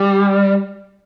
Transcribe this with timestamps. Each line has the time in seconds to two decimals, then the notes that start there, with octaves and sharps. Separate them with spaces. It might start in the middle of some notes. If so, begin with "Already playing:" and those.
Already playing: G3